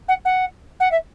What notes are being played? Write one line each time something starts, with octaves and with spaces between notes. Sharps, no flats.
F#5
F#5
F#5
E5